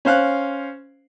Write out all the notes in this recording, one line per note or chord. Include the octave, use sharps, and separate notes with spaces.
C#4 C5 F5 F#6